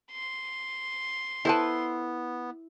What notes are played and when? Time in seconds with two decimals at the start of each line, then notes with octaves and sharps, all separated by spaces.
0.11 C6
1.45 B3 E4 A4 B4 C5 A5